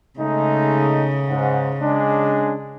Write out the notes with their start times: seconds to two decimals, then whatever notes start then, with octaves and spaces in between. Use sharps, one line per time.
0.19 C#3 G#3 A3 D#4
1.30 G#2 F#5
1.81 G#3 C#4 D4